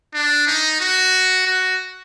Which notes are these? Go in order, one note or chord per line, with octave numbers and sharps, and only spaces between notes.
D4
D#4
F#4
F#4